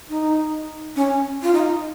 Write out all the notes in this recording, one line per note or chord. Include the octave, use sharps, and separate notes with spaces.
D#4
C#4
F4
D#4